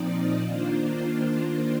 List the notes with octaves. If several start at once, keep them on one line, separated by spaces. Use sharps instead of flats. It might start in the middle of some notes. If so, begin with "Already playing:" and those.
Already playing: A#2 F3 C4 D#4 D5
D#5
D#3 A#3 D4 F4 C5